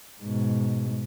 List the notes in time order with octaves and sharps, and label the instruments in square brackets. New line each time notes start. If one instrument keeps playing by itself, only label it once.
[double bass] G#2 B2